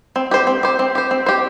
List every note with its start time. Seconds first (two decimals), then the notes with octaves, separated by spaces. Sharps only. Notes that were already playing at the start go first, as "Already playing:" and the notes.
0.16 C4
0.31 G4 C5
0.47 C4
0.63 G4 C5
0.79 C4
0.95 G4 C5
1.11 C4
1.26 G4 C5